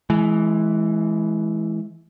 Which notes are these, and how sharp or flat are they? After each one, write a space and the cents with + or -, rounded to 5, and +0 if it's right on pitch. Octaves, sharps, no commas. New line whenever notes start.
E3 +0 G#3 +30